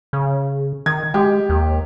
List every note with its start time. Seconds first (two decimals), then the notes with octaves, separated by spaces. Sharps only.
0.13 C#3
0.86 D#3 G#6
1.14 G#3 G4
1.49 D#2